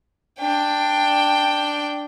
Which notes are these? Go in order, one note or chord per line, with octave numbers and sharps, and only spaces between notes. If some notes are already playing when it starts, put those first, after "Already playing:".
D4 G5